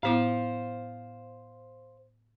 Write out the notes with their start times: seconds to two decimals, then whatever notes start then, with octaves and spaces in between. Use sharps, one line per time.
0.03 A2 B3 E4 C5 F5